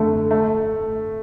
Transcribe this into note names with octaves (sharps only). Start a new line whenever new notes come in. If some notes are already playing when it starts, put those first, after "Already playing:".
Already playing: D3 A3
A3